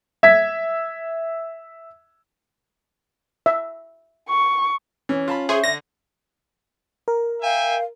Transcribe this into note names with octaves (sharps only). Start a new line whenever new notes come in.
E5 G#6 B6
E5
C#6
E3 C#4
F4 A5 B5
G#4 C5 E5 C6 C#6
D3 A#6
A#4
E5 F5 G5 G#5